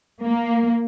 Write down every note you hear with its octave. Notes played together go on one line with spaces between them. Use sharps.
A#3